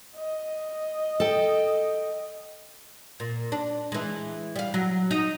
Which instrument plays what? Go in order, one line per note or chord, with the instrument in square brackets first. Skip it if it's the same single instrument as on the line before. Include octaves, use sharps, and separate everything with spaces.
[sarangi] D#5
[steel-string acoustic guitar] A4 G5
[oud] A#2
D4
E3 G#3
G3 F5
F#3
D#4